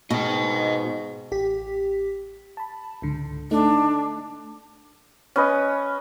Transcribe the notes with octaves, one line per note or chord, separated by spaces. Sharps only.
G#2 B2 D#5 G5
A1 G4 B6
A5 B5
C#2 G#2 D3
A3 D4 D#4
C#4 B4 D#5